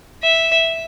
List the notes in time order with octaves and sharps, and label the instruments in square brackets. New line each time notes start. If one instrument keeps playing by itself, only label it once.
[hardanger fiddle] E5